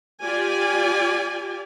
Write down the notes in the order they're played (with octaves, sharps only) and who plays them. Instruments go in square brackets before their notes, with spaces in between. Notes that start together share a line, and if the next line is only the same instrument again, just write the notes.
[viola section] F4 G4 D5 G#5